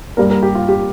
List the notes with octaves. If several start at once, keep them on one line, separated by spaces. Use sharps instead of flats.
G2 G3 A#3 A#4
A#4
G4
F4
G4